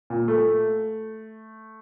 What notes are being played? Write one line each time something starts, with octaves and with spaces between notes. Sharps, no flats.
A#2
A3